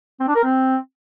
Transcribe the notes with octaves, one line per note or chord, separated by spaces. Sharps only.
C4
D4
A#4
C4